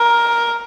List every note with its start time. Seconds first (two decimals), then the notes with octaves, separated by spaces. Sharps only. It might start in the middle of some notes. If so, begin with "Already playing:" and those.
Already playing: A#4